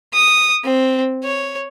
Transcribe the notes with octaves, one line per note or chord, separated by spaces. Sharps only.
D#6
C4
C#5